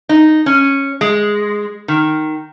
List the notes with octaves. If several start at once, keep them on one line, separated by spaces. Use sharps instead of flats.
D#4
C#4
G#3
D#3